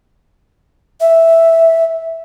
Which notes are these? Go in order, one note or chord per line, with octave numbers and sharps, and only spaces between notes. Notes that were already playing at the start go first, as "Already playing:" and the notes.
E5